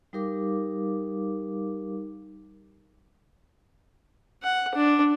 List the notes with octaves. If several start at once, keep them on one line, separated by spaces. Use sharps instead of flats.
G3 D#4 G4 A#4 F5 D6
F#5
D4